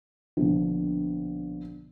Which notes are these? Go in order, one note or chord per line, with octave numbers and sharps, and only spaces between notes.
A#1 B2 D3